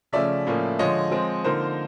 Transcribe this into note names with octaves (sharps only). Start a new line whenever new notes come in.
C#3 F3 A3 C#4 D5 E5
A2 F3 A#3 C#4
D3 F3 G#3 C#5 D#5
F3 G#3 C4
D3 F3 A#3 D#4 A#4 C5